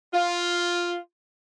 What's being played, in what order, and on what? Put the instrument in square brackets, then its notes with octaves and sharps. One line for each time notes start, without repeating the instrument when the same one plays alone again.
[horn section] F4